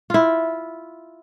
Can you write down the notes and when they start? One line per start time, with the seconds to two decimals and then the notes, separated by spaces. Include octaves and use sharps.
0.10 E4 F4